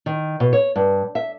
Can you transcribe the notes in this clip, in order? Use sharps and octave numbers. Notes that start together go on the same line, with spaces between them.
D#3
B2
C#5
G2
E5